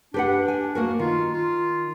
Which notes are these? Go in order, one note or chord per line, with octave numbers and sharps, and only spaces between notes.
D4 G4 B4 F#5
G4 G#5
A#3 F#4 A#4
D#3 F4
F4